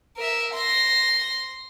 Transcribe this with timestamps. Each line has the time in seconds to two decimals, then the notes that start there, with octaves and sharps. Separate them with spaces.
0.17 A#4 E5
0.53 C6 A#6